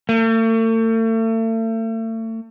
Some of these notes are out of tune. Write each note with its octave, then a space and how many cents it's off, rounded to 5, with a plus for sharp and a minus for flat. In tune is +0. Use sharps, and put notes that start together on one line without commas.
A3 +40